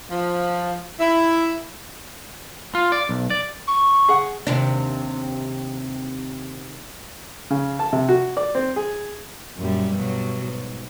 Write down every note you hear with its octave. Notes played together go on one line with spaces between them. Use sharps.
F3
E4
F4
D5
B1
D5
C#6
G#4 F#5
D#2 C3 D4
C#3
A5
C3
F#4
D5
C4
G#4
F#2 A#2 G3
G2 B2 F#3
G#2